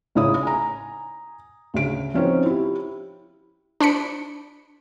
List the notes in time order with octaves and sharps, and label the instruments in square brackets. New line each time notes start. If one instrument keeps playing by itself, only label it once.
[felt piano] A1 C#3 D#4 E4 C#5 D#6
G#5 A#5
D2 C#3 D7
F3 C4 C#4 D#4 F#4 C5
E4 G4
[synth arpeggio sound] D4 C5 B5 C#7